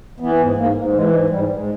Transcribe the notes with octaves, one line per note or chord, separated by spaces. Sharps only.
E3 B3
G#2
G#2 A#3
G#2
E3 G#3
G#2
G#2 G3
G#2